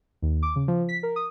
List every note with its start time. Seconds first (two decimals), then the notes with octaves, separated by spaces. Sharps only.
0.22 D#2
0.43 D6
0.56 C#3
0.68 F3
0.89 B6
1.03 A#4
1.16 D#6